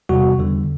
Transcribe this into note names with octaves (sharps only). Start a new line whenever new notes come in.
E2 C3 G3 F#4
E2 D3 G3